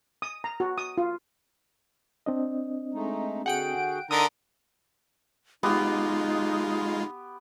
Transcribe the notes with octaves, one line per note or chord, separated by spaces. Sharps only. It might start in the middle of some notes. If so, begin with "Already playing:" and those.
D#6
A#5
F#4
D#6
F4
C4 D4 D#5
G#3 A3 D#4
D3 F#4 G#4 F#5 G5 D7
D3 D#4 A#4 D#6 E6
G#3 B3 D#4 F4 G4